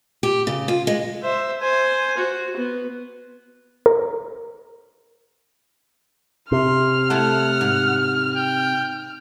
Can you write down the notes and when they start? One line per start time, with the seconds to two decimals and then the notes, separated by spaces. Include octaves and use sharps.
0.23 G4
0.47 C#3
0.68 F4
0.87 G#3
1.22 C5 E5
1.61 C5 G#5
2.17 F#4
2.57 B3
3.86 A#4
6.52 C3 C6 F6
7.10 A3 E4 A4 F#5
7.61 G#2
8.35 G5